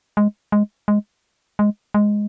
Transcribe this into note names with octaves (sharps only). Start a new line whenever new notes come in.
G#3
G#3
G#3
G#3
G#3